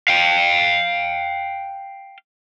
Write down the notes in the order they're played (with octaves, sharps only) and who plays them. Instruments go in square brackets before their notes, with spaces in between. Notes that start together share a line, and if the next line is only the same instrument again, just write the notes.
[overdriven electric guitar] F5 G5